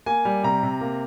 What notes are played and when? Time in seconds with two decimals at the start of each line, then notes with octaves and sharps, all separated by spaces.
0.06 A#3 G#5
0.25 G3
0.43 C3 A#5
0.63 C3
0.81 A#3